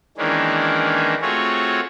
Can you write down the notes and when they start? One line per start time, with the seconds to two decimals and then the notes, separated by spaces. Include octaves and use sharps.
0.18 D#3 E3 G#3 A#3 C#4 D4
1.22 A3 C4 F4 F#4 G#4 C#5